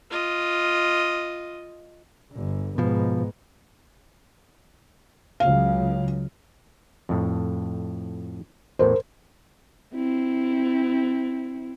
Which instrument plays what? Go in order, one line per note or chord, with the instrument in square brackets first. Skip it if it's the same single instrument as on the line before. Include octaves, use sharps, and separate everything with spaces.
[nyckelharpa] F4 D#5
[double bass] G1 D3
[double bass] G#2 B3 [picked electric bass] B2 F3
[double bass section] C#2 C#3 F#3 [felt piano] F5
[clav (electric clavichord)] F2 A2
[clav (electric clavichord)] E2 A2 [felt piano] A#4 C5
[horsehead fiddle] C4 E4